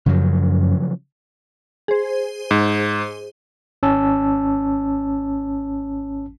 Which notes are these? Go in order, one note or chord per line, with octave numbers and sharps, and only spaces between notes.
F#2 C#3 F3 F#3
G#4 C5
G#2
G#1 C#4 A5 E6